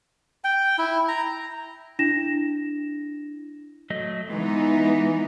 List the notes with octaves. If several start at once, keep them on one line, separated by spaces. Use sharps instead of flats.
G5
E4
A#5
D4 E4 A#6 E7
F#3 A3 D#5
E3 G#3 B3 D#4